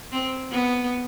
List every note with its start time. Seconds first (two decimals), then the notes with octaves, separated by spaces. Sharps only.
0.12 C4
0.51 B3